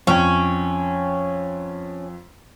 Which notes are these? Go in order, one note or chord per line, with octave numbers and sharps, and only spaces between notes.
F2 C#4 G5